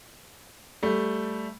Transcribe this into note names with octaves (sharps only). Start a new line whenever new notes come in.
G3 A3